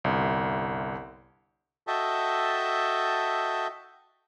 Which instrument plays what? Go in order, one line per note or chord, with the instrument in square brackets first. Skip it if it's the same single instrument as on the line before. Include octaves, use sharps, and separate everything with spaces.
[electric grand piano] G1 C2
[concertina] F#4 A4 D#5 E5 G5 A5